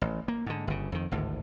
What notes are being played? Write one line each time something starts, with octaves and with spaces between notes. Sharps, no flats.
A1
A#3
G#2 D3
G1 C#3
F2 D#3
G#1 D2 A2